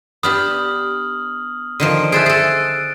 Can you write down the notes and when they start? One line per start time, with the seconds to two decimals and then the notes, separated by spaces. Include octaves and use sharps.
0.23 B3 D4 G4 D#6 F6 F#7
1.80 D3 D#3 F3 D7 D#7
2.12 G#4 C5 E5 F#6 A6 D7
2.26 G#4 A4 A6